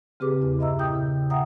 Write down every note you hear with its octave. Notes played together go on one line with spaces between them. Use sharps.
C#3 C4 G4 G#4 B4 D6
E2 E4
G2 D#5 E5 A#5 E6
A#2 E4 G5 D#6 G6
C#3
E5 F#5 G5 A#5 D#6